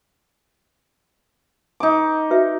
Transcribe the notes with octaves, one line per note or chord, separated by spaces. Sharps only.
D#4 D6
F#4 B4 E5